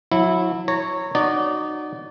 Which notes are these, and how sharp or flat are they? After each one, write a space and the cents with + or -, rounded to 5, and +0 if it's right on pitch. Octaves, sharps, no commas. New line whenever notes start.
F#3 -30 E4 -10
C#5 -5 A#5 -25
D#4 -30 F#4 +0 D5 -20